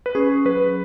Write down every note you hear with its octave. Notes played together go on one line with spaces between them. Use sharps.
B4
C#4 G#4
F#3 B4